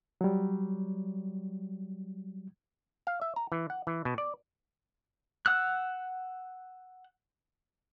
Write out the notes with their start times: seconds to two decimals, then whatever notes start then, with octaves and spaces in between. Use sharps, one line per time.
0.21 F#3 G3
3.07 F5
3.22 E5
3.36 A#5
3.52 E3
3.70 F#5
3.87 E3
4.05 B2
4.18 D5
5.46 F#5 E6 F#6